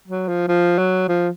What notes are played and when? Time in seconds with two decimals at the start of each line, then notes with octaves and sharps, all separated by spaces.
0.08 F#3
0.28 F3
0.49 F3
0.78 F#3
1.08 F3